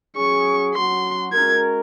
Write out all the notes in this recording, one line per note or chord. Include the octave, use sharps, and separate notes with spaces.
F#3 C#4 G#4 C#6
F#3 C#4 F#4 C6
G#3 C#4 F#4 A#4 G#6